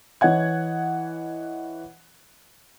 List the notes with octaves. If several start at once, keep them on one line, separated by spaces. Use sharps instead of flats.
E3 C#5 D#5 F#5 G#6